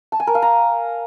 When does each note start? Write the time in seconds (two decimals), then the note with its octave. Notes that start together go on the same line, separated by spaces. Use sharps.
0.12 A5
0.20 G#5
0.27 A#4
0.35 F5
0.42 A#5